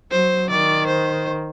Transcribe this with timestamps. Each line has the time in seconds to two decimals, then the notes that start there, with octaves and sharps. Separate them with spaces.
0.11 F#3 C5
0.50 D#3 D5
0.88 C5